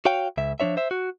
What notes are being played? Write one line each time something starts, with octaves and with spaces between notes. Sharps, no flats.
F#4 C#5 F5 G5
C#2 E5
F3 F#3 D4 C#5 E5
C5 E5
F#4